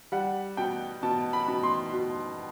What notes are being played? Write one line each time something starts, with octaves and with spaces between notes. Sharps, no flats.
G3 F#5
B2 G5
B2 A5
B5
B2
C6
B2